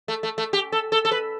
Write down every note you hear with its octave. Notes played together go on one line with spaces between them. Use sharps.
A3
A3
A3
G4
A4
A4
A4
B4